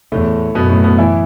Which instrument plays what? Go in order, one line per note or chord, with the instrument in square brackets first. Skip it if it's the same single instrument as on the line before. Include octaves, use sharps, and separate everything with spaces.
[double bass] E2 [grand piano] A2 A3
[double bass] F#2 [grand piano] B2 B3
[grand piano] A2 A3
B2 B3
E3 E4